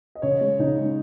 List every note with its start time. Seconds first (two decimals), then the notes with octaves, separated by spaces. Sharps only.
0.15 D#5
0.22 C#3 C#5
0.41 G#3
0.59 C#3 D#4
0.78 G#3